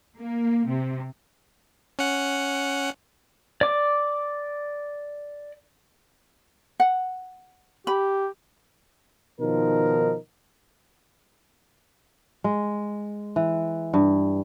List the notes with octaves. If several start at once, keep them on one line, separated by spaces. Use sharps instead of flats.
A#3
C3
C#4 F#5
D5 D6
F#5
G4 B5
B2 D#3 F3 D#4 A#4
G#3
E3
G2